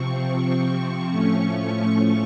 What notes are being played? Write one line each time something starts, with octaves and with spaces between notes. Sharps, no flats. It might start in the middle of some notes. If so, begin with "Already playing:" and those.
Already playing: C3 F3 C4 C#6
A2 F3 A3 C#4
C#6